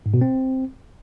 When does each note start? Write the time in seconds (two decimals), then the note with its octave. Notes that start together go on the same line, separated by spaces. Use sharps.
0.06 G#2
0.14 B2
0.21 C4